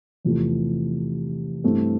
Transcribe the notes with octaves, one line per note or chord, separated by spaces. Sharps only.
E2 C3 F3 A3
G2 E3 A3 C4